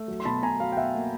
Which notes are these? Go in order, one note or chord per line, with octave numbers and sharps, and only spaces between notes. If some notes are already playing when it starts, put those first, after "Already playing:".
Already playing: A3
F#3
C6
B2 A5 B5
B2 G#5 A#5
F#3 F5
G5
B2 E5 F#5
A#3